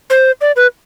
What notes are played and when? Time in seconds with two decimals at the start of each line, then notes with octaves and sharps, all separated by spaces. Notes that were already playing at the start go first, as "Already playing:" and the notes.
0.10 C5
0.41 D5
0.56 B4